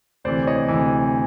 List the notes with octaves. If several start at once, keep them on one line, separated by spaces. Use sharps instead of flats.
D2 C3 E3 C5 D5
C#5 D#5
D2 C3 E3